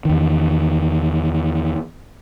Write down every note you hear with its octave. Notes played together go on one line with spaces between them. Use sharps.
E2 D#3